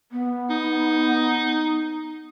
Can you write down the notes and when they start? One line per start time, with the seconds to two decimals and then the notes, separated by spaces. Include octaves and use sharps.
0.12 B3
0.50 D#4